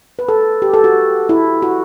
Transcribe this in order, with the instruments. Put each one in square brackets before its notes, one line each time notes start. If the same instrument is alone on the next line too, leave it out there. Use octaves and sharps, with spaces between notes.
[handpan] B4
A4
G4
A4
F#4
E4
F#4